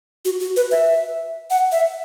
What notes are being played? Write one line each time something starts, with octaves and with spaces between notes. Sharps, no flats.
F#4
F#4
B4
E5
F#5
E5